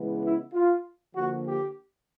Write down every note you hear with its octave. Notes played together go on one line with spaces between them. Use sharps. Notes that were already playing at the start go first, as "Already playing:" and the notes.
Already playing: C#3 E3 G#3 B3
E4
F4
D3 F3 A#3 F#4
G4